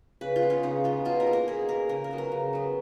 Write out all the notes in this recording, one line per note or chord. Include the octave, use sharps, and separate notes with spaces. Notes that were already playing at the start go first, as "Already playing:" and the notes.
C#3 B4
F4
G#3 B3
C#4
C#3 D#4
G#3 B3 F4
B2 F4
A#4
A#3
A#4
B2 G#4
A#3 A#4
C#3 A#4
A#4
F#3 B3
A#4
C#3
F#3 B3